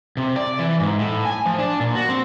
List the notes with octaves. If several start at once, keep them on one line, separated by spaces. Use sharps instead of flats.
C3
D5
E3
G#2
A2
G#5
F3
D4
A#2
F#4
C4